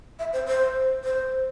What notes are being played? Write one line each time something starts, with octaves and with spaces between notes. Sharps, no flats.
E5
C5
C5
C5